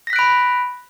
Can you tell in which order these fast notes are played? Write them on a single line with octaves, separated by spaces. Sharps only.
A#6 B6 F#6 D7 B5